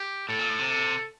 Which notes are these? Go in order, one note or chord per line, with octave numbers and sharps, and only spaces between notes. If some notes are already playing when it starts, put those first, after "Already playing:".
Already playing: G4
A2 A4
A#2
A2
C3
A4